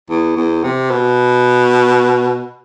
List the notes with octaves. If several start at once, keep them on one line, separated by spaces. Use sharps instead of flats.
E2
E2
C3
B2